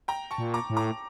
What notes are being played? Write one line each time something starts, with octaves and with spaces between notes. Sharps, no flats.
G5 A#5
A5 C#6
A#2
A#5 D6
A2
A#5 D6